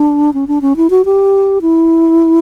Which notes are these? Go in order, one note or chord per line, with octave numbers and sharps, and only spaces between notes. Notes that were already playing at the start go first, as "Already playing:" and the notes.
Already playing: D4
C#4
D4
C#4
E4
F#4
G4
E4